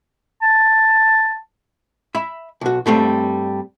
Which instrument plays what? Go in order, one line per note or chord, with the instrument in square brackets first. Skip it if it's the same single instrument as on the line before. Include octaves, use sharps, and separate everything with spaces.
[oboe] A5
[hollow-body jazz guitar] E5 B5
B1 F#4
G2 G3 A3 C4